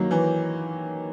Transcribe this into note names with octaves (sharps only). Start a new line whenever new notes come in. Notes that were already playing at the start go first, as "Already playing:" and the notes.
Already playing: D#3 F#3 A#3
E3